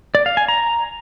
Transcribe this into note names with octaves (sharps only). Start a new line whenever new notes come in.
D5
F5
G#5
A#5